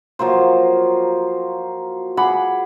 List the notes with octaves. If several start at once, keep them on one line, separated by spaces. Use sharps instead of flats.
F3 F#3 A#3 C5
G#4 F#5 B5 D6